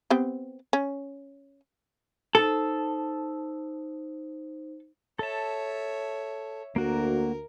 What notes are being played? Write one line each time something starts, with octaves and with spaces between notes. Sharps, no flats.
B3 C4 G4
C#4
D#4 A4 C5
A4 C#5 E5 A5
D2 A#3 F#4 A#4